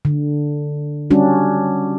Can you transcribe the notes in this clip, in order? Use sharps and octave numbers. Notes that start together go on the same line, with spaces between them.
D3
G3 C#4 D4 F#4